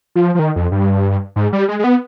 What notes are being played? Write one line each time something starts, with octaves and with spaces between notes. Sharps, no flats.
F3
F3
D#3
F2
G2
G#2
G3
G#3
G#3
B3